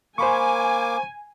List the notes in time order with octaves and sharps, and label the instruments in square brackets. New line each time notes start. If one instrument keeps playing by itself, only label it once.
[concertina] A#3 D6 [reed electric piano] C5 B5 C#6 [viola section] G#5